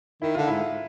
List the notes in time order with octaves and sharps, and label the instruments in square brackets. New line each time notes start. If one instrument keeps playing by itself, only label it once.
[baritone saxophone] D#3 [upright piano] E4
[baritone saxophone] D3 [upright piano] F4
[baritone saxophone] G#2 [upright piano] E4